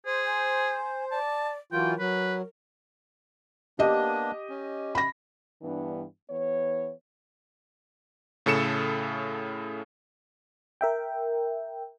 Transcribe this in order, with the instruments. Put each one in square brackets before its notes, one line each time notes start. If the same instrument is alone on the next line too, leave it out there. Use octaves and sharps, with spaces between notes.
[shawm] G#4 [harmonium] C5
[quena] G#5
[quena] D5 [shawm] A5
[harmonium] E3 F#3 F4 [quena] A#4 [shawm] G5
[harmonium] F#3 [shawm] B4
[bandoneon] A#3 B3 D4 [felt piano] G4 D#5
[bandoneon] C#4
[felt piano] B5 A#6
[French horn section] G2 E3 B3 D4
E3 B3 C#5
[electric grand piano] A2 C#3 A4 C#7 E7
[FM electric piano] A#4 E5 G5